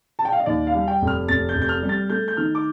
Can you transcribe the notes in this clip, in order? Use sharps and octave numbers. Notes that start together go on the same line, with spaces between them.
A5
G5
F5
D#5
D#2 D5
F5
G3
G5
F1
F6
F1 A6
G6
F1
G6
F6
G3
A6
A3 G6
G6
D#3 F6
D6